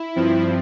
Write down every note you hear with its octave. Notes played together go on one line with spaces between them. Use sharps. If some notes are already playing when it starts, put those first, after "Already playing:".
Already playing: E4
G2 F3 C4